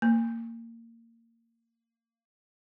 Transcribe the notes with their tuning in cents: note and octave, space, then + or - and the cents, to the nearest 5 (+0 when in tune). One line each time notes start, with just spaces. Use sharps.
A#3 -20